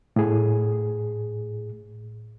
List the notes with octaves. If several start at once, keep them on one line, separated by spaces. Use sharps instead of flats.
A2 G#4